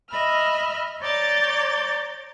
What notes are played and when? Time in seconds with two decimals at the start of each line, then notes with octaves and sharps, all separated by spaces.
0.10 D#5 E5 B5 F6
1.01 C#5 D5 A#5 D6 G6 A6